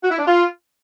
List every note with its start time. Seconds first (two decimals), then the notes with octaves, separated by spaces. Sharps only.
0.03 F#4
0.11 E4
0.19 D4
0.27 F4